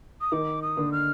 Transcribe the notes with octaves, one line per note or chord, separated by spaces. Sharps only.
D#6
D#3 D#4 D6
D#6
D3 D4
F6